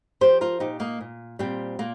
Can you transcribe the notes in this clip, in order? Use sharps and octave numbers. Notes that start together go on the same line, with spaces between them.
F3 G4 C5
F4 A#4
A#2 D#4 G4
A#3 D#4
A#2
A#2 G3 C4
A#2 A#3